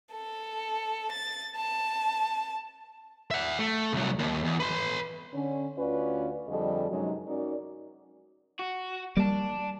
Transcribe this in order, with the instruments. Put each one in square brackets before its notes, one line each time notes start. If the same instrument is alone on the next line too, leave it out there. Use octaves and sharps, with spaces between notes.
[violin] A4
A6
A5
[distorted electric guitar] E5 F#5
A3
C2 F#3
D#2
E2
B4 C6
[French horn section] D3 C#4
D2 C#4 F4 F#4 B4 D5
F2 D3 G3 G#4 A4 D#5
F#2 C3 F#3 G#3 D#4
C#4 D#4 F#4 A#4 D5
[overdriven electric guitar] F#4
[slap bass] G3 A#3 [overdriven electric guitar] D5 A5